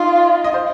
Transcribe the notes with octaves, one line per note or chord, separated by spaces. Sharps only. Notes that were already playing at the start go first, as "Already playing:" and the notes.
Already playing: D#4 F4
D#5
C5